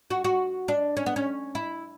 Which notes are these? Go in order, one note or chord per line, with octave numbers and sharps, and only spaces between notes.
F#4
F#4
D4
C#4
B3
C#4
E4